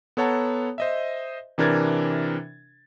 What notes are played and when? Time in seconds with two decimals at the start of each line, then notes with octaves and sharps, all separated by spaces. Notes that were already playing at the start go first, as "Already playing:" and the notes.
0.17 B3 A4 C#5 F#5 A5 A#5
0.78 C5 D#5 E5
1.58 C3 E3 D4 A#4 G#6 A6